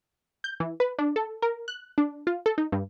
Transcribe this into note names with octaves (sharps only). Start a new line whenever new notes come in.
G6
E3
B4
D4
A4
A#4
F#6
D4
F4
A4
D#4
G2